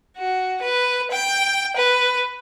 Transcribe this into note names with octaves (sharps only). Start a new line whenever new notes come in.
F#4
B4
G5
B4